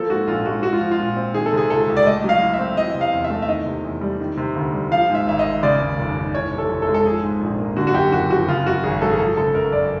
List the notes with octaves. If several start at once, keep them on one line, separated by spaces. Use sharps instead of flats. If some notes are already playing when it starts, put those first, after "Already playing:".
Already playing: F3 A#3 A4
G#2 F#4
A#1 F4
G#3 F#4
G#3 F#4
F4
F3
F4
A#2
C4
D#3 G#4
A4
C3 G#4
C#2 A4
C#2
D5
A3 D#5
F#3 F5
A2
E5
C4
E3 D#5
C3
F5
E2
E5
A3
E5
D#3 D#5
C3
E2
G3
D#3
C3
D2
G3
F3 F5
G#2
E5
G#1 E5
D#5
G#1
C#3 D5
D#2
F1
F1
E3 C#5
C3
A4
F2
A4
G#3
A4
F3 G#4
G#2
A#1
A#3
D3 F#4
F#4
F#2 G4
F#1 F#4
F3 F#4
C#3 F4
F#2 F#4
G#1 G#4
F#3 A4
G#4
F3 A4
C#3 A4
F#2 A#4
F#2 D5